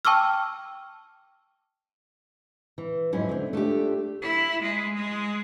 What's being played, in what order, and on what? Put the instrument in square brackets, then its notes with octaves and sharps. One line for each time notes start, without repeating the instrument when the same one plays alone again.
[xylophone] G5 A5 C#6 D6 E6 F6
[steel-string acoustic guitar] E3
F2 G#2 F#3 C#4 E4
D3 C4
A3 D4 F4 G4
[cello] E4
G#3
G#3